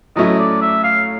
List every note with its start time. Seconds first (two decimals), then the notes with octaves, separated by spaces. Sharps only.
0.16 A2 F#3 A3 C#4 E4 D#5
0.39 D5
0.61 E5
0.84 F5